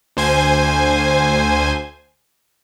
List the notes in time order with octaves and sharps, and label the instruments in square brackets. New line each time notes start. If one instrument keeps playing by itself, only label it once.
[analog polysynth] D2 C5 G#5